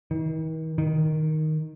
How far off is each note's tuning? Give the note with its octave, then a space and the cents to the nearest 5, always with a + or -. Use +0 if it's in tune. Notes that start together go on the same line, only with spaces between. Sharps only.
D#3 +45
D#3 +0